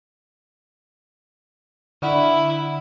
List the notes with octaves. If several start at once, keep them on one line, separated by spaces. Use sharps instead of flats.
D3 E4 D5 F#5